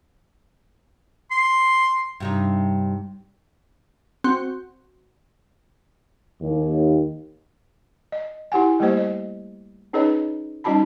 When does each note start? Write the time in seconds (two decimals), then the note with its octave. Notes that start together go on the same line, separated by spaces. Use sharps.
1.31 C6
2.20 G2 C3 D#4
4.24 C4 F#4
6.41 D#2
8.12 D#5
8.52 E4 G4 F#5 G#5
8.80 G3 A3 A#3 G4 C5 D#5
8.97 D#5
9.93 C#4 D#4 G#4 B4 C#5 D#5
10.64 G3 C#4 D#4 F#4 A5 B5